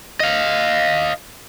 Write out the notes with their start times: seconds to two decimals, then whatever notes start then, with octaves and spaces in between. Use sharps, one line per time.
0.20 D#5 F5